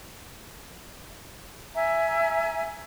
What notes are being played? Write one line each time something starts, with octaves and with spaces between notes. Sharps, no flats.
E5 G#5 A#5